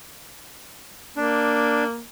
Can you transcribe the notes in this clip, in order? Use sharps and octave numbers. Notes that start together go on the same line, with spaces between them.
A#3 D4